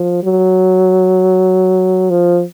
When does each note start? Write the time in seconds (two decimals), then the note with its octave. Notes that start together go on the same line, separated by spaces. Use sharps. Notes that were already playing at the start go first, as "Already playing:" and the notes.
Already playing: F3
0.24 F#3
2.10 F3